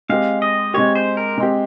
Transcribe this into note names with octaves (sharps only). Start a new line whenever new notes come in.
G#3 C4 G4 F5
D#5
G#3 C4 G4 C#5
C5
A#4
G#3 C4 G4